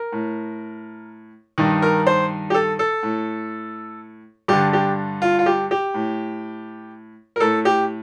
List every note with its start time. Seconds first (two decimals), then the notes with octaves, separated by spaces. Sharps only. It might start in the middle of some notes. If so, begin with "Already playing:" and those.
Already playing: A#4
0.12 A2
1.58 G2 D#3
1.82 A#4
2.07 C5
2.50 G4
2.54 A4
2.79 A4
3.03 A2
4.48 G2 D3 G4
4.73 G4
5.22 F4
5.39 F4
5.46 G4
5.71 G4
5.94 A2
7.36 A#4
7.40 A2 A4
7.65 G4